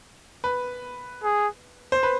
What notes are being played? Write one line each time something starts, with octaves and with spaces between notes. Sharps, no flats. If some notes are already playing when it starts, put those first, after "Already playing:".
B4
G#4
C5
B4